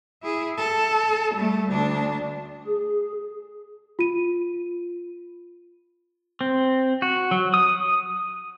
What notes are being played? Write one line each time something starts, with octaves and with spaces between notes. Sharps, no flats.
E4 G#4
A4
G3 A3
D2 D4
G#4
F4 D#7
C4
F#4
F#3
D#6